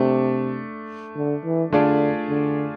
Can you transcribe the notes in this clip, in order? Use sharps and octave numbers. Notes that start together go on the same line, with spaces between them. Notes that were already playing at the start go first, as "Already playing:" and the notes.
Already playing: C3 A3 D4
D3
E3
D3 A3 D4 F4 G#4 D5
D3